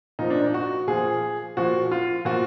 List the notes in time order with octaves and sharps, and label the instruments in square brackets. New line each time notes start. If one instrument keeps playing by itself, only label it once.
[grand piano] A#2 F3 D#4
D4
D#4
F#4
A#2 F3 G#4
A#2 F3 F#4
F4
A#2 F3 F#4